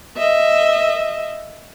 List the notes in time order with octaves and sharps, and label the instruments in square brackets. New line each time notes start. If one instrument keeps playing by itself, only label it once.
[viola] D#5 E5